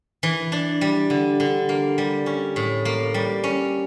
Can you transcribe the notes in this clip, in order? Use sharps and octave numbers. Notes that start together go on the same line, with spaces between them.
E3
D4
G3
D3
D3
A#3
G3
C#4
A2
A#3
G3
C#4